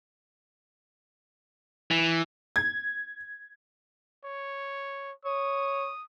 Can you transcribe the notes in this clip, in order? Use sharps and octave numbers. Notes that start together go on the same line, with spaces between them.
E3
G#6
C#5
C#5 D#6